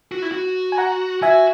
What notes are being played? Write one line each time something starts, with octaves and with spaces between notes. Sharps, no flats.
F#4
E4
F#4
G#5
F#5 A#5
F#4 E5 G#5